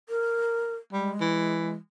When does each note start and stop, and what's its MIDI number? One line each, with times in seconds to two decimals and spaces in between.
0.09 0.74 70
0.92 1.13 55
0.92 1.73 56
1.21 1.77 52